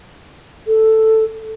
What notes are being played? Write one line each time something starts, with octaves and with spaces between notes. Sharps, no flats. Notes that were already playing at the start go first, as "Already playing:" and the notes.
A4